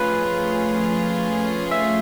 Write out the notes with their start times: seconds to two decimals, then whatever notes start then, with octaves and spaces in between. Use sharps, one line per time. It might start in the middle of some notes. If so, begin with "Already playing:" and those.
Already playing: F3 A3 C#4 F4 G#4 B4
1.71 E5